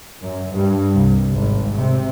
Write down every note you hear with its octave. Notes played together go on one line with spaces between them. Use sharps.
F#2
G2
C2
G#1
C3